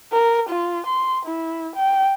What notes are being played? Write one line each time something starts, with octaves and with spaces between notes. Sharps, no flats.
A#4
F4
C6
E4
G5